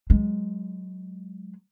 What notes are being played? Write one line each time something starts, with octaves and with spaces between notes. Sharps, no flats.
F#3 G#3